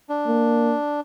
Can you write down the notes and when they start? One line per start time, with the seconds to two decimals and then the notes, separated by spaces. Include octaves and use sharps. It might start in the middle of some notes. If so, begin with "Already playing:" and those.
0.09 D4
0.27 A#3